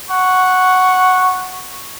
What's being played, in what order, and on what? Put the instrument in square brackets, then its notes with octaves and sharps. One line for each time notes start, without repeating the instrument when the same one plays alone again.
[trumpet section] F#5 C#6